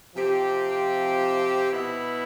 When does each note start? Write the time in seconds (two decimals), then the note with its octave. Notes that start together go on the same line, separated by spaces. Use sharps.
0.14 C3 F3 C4 G4
1.69 B2 B3 E4